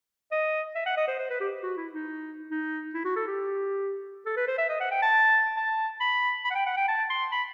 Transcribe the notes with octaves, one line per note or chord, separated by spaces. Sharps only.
D#5
E5
F#5
D#5
C5
C5
B4
G4
F#4
E4
D#4
D#4
E4
F#4
A4
G4
A4
B4
C5
E5
D#5
F#5
G5
A5
A5
B5
B5
F#5
G5
F#5
G5
A5
C6
B5